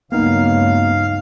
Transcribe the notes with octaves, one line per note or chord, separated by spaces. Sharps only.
C#2 G2 F#3 A#3 B3 D#4 F5